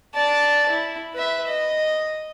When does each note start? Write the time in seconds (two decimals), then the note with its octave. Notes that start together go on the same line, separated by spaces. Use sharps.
0.14 D5 A5
0.69 E4
1.14 B4 E5
1.47 D#5